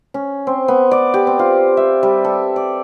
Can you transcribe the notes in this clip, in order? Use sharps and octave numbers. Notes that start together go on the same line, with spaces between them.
C#4
C4
B3
D5
G4
C4
F4
E5
G3
A4
D5